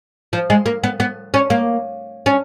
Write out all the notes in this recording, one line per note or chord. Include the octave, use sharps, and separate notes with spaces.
F3
G#3
A#3
B3
B3
C#4
A#3
C#4